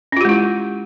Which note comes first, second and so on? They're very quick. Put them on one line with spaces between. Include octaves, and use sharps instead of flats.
C#4 F4 G4 G#3 E4